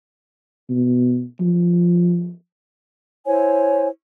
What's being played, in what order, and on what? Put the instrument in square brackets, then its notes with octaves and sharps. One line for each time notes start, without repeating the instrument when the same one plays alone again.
[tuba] B2
F3
[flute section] E4 C5 C#5 G#5